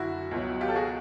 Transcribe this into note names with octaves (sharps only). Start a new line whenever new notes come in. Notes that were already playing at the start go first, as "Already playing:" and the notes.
Already playing: F#1 F#2 D3 E4 F#4
C#2 B2 F#3
F4 G4
A4
F#4 G#4